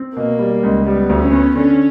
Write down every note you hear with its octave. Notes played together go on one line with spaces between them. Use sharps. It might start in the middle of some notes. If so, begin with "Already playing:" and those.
Already playing: C4
B2 A#3
G3
C#2
G3 B3
D2
C#4
B3
D3 C#4